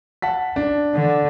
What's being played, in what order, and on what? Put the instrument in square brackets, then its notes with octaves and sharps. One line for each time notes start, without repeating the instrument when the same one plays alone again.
[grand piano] F#5 A5 B6
D4
[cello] D3